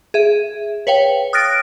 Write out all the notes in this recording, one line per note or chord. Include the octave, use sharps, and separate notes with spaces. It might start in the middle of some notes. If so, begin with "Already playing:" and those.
G#4 E5
B4 C#5 F5 G5
D#6 F6 F#6 A6 A#6 D7